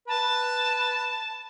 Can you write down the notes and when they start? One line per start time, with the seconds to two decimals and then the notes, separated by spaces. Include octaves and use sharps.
0.08 B4 A5